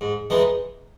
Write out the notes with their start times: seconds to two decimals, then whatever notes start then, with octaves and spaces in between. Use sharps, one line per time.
0.01 G#2
0.30 E3 G#3 B3 D#4